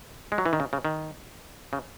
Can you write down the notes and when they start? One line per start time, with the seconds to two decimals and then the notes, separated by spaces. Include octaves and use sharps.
0.32 G#3
0.38 F#3
0.46 E3
0.53 D#3
0.60 C#3
0.73 C#3
0.85 D#3
1.73 C#3